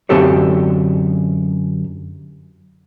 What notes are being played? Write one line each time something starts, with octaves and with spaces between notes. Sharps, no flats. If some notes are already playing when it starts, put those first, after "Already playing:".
F#2 D3 C4 G4 A4 C#5